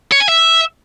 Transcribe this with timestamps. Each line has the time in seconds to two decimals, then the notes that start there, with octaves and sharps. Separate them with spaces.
0.12 C#5
0.20 G#5
0.28 E5